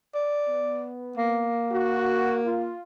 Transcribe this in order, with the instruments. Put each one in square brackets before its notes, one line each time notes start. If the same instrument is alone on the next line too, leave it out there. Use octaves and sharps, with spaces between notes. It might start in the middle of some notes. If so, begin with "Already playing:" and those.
[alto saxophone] D5
[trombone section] B3
[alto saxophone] A#3
[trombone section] F#4
F4